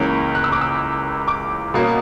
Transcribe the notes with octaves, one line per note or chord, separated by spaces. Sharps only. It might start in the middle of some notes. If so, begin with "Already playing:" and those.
Already playing: C#2 C#3 E3 A#3 C#6
F#6
E6
D6
E6
D6
B2 A#3 C#4